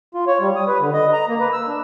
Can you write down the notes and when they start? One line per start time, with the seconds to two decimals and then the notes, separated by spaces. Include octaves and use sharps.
0.14 F4
0.27 C#5
0.40 G3
0.56 D#6
0.68 B4
0.80 D3
0.93 D#5
1.13 A#5
1.28 A#3
1.40 B4
1.53 E6
1.67 D4